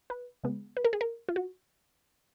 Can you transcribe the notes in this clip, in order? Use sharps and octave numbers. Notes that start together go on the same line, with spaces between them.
B4
C#3 G#3 B3
B4
A#4
G#4
A#4
F4
F#4